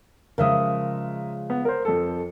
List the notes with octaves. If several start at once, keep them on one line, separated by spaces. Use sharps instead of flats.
C#3 F3 G#3 A#4 E5 D#6
B3
A#4 C5
F2 A4